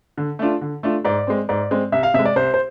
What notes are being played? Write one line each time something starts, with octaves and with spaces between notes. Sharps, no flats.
D3
A3 D4 F4
D3
A3 D4 F4
G#2 D5
G#3 C4
G#2 D5
G#3 C4
C2 E5
F5
C3 G#3 E5
D5
C2 C5
C5